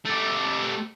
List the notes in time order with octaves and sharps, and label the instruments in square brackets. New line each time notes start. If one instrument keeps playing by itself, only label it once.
[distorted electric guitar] A3 G4